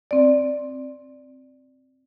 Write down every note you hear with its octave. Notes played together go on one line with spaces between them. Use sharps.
C4 D5